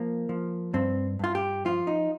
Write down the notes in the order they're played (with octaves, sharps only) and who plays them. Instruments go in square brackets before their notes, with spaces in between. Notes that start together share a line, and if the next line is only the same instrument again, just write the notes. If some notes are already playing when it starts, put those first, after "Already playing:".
Already playing: [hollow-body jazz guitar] F3 A#3
F3
G2 C4
G2 F4
G4
F3 F4
D#4